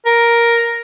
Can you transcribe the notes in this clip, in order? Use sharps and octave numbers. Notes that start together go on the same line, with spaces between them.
A#4